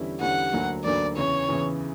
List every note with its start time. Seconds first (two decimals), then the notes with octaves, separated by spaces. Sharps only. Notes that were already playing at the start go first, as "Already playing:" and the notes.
Already playing: E2 D3 G3 C#4 E4
0.21 E2 D3 G3 C#4 E4 F#5
0.52 D2 D3 F#3 A#3
0.84 D2 D3 F#3 A#3 D5
1.16 E2 C#3 E3 C#5
1.49 E2 C#3 E3